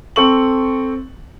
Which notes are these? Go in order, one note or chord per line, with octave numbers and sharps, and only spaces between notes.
C4 A4 C#6 F#7